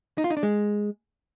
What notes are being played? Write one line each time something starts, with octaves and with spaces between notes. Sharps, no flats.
D#4
F4
D#4
D4
G#3